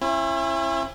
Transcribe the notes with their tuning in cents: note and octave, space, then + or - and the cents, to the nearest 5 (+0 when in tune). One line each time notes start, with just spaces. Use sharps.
C#4 -40 E4 +20